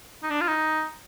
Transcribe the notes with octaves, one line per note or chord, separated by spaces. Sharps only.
D#4
D4
F4
D#4